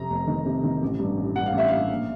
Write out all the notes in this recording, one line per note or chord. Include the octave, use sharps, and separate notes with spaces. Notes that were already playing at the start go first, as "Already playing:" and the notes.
Already playing: F2 C3 A#5
F1
D#3
C3
D#3
A1
G2
A1
G2 F#5
F5
A1 E5
G2 F5
A#1